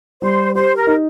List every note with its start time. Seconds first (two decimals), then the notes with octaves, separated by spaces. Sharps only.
0.22 G3 C5
0.54 G4 C5
0.76 A#4
0.87 D#4